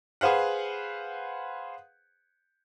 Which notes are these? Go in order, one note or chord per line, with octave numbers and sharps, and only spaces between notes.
G#4 B4 C5 F5 F#5